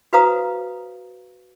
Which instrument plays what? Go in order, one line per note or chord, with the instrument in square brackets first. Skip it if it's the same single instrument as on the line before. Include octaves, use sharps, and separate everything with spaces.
[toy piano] F#4 B4 C5 F5 A#5 D#6